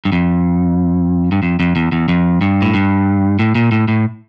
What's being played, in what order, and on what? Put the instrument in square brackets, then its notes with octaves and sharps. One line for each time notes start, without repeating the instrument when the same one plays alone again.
[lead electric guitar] G2
F2
G2
F2
F2
E2
E2
F2
G2
A2
G2
A2
A#2
A2
A2